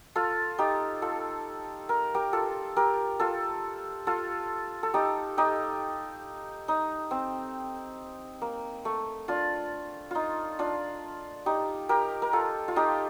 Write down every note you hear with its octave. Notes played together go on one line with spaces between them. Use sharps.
F4 A4
D#4 G4
F4 A4
A#4
G4 A#4
F4 A4
G4 A#4
F4 A4
F4 A4
A4
D#4 G4
D#4 G4
D#4
C4
A#3
A3
D4 F4
D#4 F4
D4 F4
D#4 G4
G4 A#4
A#4
F4 A4
F4
D#4 G4